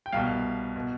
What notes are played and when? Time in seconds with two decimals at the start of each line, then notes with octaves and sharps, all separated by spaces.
0.06 G5
0.13 C2 B2 F5
0.76 B2